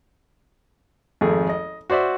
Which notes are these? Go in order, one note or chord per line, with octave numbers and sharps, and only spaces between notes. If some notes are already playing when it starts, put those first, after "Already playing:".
G#1 F2 A3 G#4
D#5
F#4 C5 D5 E5